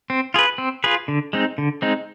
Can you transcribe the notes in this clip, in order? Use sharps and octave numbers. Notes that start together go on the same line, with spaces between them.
C4
F4 G#4 B4
C4
F4 G#4 B4
D3
G#3 C4 D#4
D3
G#3 C4 D#4